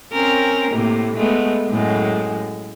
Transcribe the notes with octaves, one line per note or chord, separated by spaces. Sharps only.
C4 C#4 A#4
A2 C3 A#3
G#3 A3 B3
F#2 A2 G#3